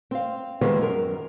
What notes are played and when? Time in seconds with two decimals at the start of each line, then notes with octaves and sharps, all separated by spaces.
0.11 C4 F5
0.61 D#3 F3 G3 G#3 B3 C4
0.81 F#2 A#4